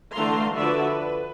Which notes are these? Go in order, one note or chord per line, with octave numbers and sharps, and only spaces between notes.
D3 E3 A3 F5 A#5 C6
D3 F3 F#4 B4 D5 E5
B4